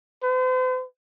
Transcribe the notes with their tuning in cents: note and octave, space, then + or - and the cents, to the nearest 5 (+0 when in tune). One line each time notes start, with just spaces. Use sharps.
C5 -45